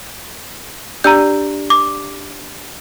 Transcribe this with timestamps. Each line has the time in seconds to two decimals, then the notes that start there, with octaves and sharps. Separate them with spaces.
1.04 D4 G4 D5 A#5 E6 G6
1.70 D6